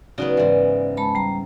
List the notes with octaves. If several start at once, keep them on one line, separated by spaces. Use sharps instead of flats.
C#3 F#3 B3 D#4 F#4 D5
G#2 E3 D5
G#3 A5 B5
G3 A#5